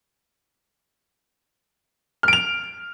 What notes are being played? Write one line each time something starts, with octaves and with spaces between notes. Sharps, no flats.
F6 D7 F7